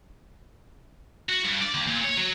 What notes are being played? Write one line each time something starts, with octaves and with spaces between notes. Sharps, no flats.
F#4
G2
D5
D#2
A#2
C#5
F#3